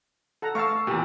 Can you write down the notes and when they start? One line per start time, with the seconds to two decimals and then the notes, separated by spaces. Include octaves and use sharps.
0.42 A4 F#5 A#5
0.55 A3 F5 A5 C#6 E6
0.87 E2 A#2 G4